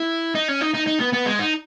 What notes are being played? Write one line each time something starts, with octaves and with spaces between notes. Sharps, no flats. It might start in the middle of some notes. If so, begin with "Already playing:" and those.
Already playing: E4
D#4
C#4
D#4
D#4
D#4
B3
B3
G#3
D#4